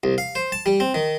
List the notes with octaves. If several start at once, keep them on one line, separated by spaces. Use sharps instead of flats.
C2
F5
C5
A5
G3
C4
D#3